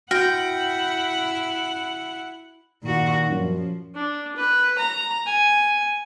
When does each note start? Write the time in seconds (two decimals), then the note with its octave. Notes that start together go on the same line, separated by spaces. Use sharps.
0.11 E4 F#4 F#5 G5 F6 A#6
2.83 A#2 D#3 F#4
3.30 F#2 F3
3.95 D4
4.36 B4
4.78 A#5
5.26 G#5